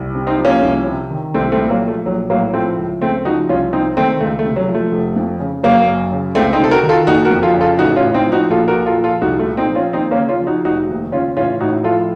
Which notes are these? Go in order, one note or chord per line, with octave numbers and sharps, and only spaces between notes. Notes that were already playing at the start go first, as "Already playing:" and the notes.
Already playing: C2
C3
C4 D#4
F3
A#3 C#4
C2
C3
D#3
C2 A3 C4
A3 C4
A#2
F#3 A#3
F3
A3
A#1 F#3
A2 F#3 A#3
F3 A3 C4
C#2
C#3 A3 C4
F3 D#4 F#4
C2 C#4 F4
C3 C4 D#4
D#3 A3 C4
C#2 A3
A3
C3
F#3
F3
A3
F1
F2
C#3
F#1 F#3 A#3
F#2
C#3
C#2 A3 C4
C4 D#4
C3 A4
F#4 A#4
D#3
F4 A4
F#1 D#4 F#4
F#4 A#4
F2
F4 A4
C#3
F4 A4
A1 D#4 F#4
C#4 F4
A2
C4 D#4
F3
D#4 F#4
A#1 F4 A4
F#4 A#4
A#2
F4 A4
F3
F4 A4
C2 D#4 F#4
A3
A#2
C4 D#4
F3
C#4 F4
D#2 C4 D#4
A#3 C#4
C#3
C#4 F4
F3
D#4 F#4
F1 D#4 F#4
D#2
C#3 C#4 F4
A1 C#4 F4
A2 D#4 F#4
F3 F4 A4